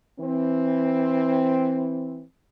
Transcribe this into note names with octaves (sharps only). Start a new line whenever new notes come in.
E3 C4